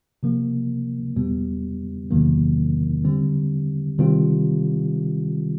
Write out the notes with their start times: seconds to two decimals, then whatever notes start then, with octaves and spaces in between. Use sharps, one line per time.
0.23 C3 F3 A#3
1.16 E2 B2 G3 B3
2.10 E2 C3 D#3 F#3 A#3
3.05 D3 G3 C4
3.99 C3 D#3 G3 C4 F4